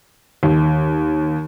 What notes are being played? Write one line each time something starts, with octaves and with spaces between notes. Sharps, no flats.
D#2